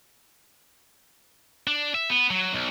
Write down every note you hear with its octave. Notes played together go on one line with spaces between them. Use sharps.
D4
E5
B3
F#3
B1